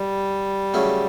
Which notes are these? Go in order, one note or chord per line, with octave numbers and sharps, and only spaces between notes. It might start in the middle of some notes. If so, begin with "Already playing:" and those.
Already playing: G3
C#3 F#3 A3 C#4 E4